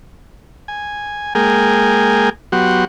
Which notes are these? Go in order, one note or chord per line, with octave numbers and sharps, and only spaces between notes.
G#5
G#3 A#3 G#4 A#4 G5 G#5
F#3 B3 F#4 G4 F#5 C6